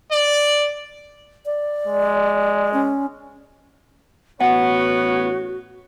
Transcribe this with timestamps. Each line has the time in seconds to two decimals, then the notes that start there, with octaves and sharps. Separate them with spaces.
0.12 D5
1.46 D5
1.87 G#3
2.73 C#4
4.40 A1 B3 F#4 C#5 F#5